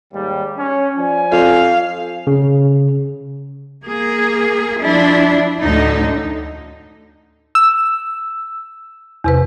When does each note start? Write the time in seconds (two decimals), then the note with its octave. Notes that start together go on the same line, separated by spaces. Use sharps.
0.14 D#2 G#2 G3
0.58 C#4
0.98 F3 D5 G#5
1.32 F2 F5
2.27 C#3
3.83 A#3 G#4
4.81 F3 D4 E4
5.61 D2 A2 D3 D#4
7.55 E6
9.24 E2 C3 B4